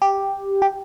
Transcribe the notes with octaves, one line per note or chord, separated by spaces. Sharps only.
G4
G4